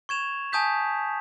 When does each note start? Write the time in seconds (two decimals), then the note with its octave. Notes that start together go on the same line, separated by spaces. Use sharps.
0.09 C#6 G#6 E7 F7
0.52 G#5 A5 D#6 G6 B6